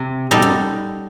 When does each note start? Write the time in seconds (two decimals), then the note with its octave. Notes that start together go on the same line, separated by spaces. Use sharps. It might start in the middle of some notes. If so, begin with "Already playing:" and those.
Already playing: C3
0.31 B2 G3 D#4 A4
0.42 F#2